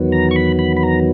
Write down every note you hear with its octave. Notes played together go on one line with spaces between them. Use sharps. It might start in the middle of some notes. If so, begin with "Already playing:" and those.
Already playing: E2 D#3 F#3 B3
A#5
C#6
B5
B5
B5
A#5